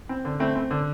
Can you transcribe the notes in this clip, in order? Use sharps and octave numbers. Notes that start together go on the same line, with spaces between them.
C4
D3
A3 C4
C4
D3